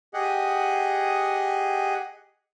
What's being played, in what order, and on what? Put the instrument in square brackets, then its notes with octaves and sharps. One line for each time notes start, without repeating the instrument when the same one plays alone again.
[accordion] G4 G#4 D#5 F#5